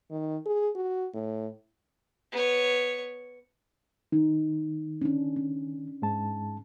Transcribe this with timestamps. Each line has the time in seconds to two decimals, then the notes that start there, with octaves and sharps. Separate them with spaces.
0.11 D#3
0.46 G#4
0.76 F#4
1.14 A2
2.32 B3 C#5
4.12 D#3 D#4
5.02 C#4 D4
5.36 C#4
6.02 G#2 G#3 A5